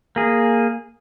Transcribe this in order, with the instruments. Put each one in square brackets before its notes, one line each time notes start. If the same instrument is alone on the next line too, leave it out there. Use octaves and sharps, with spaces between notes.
[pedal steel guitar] A#3 G#4